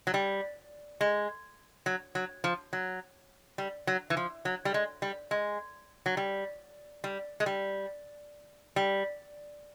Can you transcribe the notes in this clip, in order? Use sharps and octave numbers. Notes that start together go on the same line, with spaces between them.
F#3
G3
G#3
F#3
F#3
F3
F#3
G3
F#3
E3
F3
F#3
G3
G#3
G3
G#3
F#3
G3
G3
G#3
G3
G3